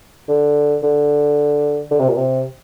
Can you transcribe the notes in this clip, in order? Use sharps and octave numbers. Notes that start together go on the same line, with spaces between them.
D3
D3
D3
C3
A#2
C3